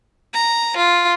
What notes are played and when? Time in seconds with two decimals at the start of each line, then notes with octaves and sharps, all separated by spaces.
0.33 A#5
0.76 F4